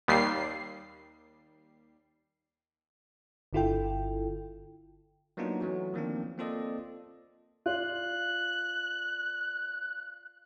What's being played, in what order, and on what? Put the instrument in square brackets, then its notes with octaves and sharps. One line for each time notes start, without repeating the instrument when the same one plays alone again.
[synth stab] D#2 G3 C7
[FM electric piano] G1 D3 E4 F4 A4 G5
[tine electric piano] F#3 A#3 B3 D4 D#4 F4
E3 F#3 A3 C#4 F#4
D#3 F3 A#3 C4 D4
A#3 C4 F4 A4 D5 D#5
[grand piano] F4 D5 [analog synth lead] F#6